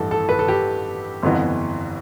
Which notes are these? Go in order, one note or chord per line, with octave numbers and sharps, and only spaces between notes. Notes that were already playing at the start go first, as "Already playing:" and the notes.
Already playing: A1 G2 E3 A4
A4
B4
A4
G4
G1 F2 E3 B3